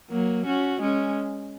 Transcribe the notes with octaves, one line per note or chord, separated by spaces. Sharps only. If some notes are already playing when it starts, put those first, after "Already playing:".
F#3 A#3
C#4 F#4
G#3 C#4